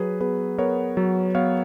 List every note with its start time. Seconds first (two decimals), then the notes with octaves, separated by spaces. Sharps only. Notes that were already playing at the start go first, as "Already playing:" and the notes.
Already playing: F#3 G#4 B4
0.20 B3 G#4 B4
0.58 B3 A#4 C#5
0.97 F#3
1.35 B3 C#5 F5